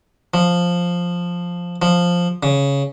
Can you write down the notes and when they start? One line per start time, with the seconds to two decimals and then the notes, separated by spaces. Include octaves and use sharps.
0.34 F3
1.82 F3
2.43 C#3